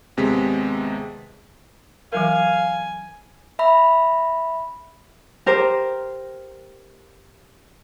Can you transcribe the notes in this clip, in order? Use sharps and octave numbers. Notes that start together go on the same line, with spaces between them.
D#2 C3 G#3 B3 B6
E3 F#3 A#4 F5 G#5
E5 B5
G4 A#4 C5